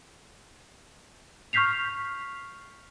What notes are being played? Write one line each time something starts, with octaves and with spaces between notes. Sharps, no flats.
C#6 F6 G6 B6 C7 F7